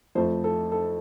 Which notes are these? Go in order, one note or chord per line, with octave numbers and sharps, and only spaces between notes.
F2 F3 A3 C5
A4
A4